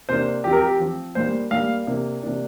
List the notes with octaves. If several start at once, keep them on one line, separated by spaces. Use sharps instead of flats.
C3 A#3 D4 C5
F3 C4 G4
A#4
G4
F3 C4
A#2 G3 A#3 D4 C5
A#2 G3 A#3 D4 F5
C3 A#3 D4
C3 A#3 D4